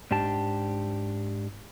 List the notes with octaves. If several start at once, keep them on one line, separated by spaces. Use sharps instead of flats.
G#2 D4 G4 A5